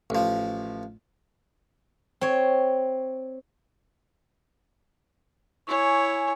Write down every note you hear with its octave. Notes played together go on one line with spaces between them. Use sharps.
A1 F3
C4 C#5
E4 C#5 G#5 C#6